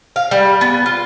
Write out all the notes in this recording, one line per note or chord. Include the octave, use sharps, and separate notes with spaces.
F5
G3
B3
F4